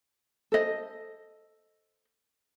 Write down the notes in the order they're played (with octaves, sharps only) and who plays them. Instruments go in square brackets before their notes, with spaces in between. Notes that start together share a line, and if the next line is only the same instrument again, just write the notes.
[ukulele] A4 C5 D#5